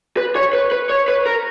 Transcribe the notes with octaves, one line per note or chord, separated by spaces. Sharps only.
B4
C#5
B4
B4
C#5
B4
A#4